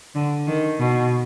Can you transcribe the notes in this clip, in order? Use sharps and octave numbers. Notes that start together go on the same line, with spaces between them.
D3
D#3
B2